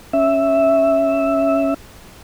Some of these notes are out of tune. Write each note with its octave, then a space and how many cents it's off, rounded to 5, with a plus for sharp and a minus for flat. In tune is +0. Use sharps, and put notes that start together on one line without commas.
C#4 +0 E5 +0